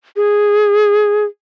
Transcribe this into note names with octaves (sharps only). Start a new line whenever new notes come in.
G#4